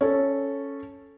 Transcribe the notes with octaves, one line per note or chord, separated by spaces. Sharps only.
C#4 A4